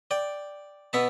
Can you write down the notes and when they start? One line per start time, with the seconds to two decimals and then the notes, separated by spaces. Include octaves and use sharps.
0.11 D5 G5
0.93 B2 B3 E5 A5